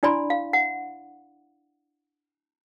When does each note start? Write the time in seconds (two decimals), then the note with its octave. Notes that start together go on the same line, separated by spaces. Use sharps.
0.03 D4 E4 D5 G#5 B5 C6
0.30 F5
0.53 F#5